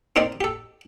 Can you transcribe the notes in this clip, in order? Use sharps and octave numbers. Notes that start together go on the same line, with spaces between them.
C4 D#4 A#4 C5 D5
G4 A4